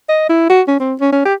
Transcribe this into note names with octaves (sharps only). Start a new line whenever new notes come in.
D#5
E4
F#4
C#4
C4
C#4
C#4
G4